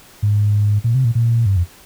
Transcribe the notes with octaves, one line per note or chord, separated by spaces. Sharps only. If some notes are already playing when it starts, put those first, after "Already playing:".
G#2
A#2
C3
A#2
A#2
G2
F2